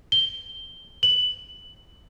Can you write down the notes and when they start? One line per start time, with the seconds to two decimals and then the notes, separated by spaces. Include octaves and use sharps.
0.12 G7
1.03 F#7